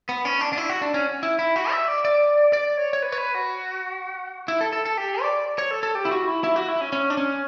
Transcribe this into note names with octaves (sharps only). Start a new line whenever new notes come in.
B3
C#4
D4
D4
E4
F#4
D4
C#4
E4
E4
F#4
E5
D5
D5
D5
C#5
C#5
B4
C#5
B4
F#4
E4
A4
A4
A4
G4
D5
C#5
A4
A4
G4
E4
F#4
E4
E4
F#4
E4
C#4
C#4
D4
C#4